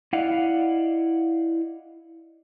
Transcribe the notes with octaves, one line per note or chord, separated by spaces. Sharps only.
E4 D5 D#5 F5 F#5